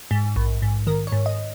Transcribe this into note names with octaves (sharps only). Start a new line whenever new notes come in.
G#2
A#1
G#2
D#3 A#4
C#5
G#2
D#5